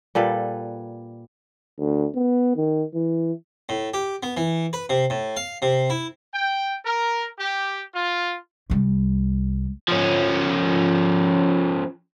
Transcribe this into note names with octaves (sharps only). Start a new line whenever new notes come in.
A#2 G3 A4 B4
D2
B3
D#3
E3
A2
G4
B3
E3
B4
C3
A2
F5
C3
E4
G5
A#4
G4
F4
C2 G3
F3 C#4